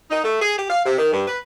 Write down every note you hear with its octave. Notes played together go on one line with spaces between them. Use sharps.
D#4
A3
G#4
G4
F5
C3
D#3
G2
B4